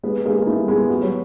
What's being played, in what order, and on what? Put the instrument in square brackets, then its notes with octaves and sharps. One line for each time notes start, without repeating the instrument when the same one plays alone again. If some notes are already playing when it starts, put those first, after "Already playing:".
[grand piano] G#3 [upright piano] B3
[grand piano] G#3 [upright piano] A#3
[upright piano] A3 [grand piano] E4
[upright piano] G3
[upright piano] G#3 [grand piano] B3
[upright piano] G3 [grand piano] F#4
[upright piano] F#3